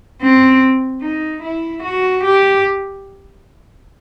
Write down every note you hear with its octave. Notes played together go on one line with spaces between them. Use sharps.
C4
D#4
E4
F#4
G4